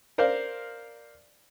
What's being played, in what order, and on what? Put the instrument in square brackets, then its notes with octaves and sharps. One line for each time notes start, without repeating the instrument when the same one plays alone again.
[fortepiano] A#4 C5 D5 F5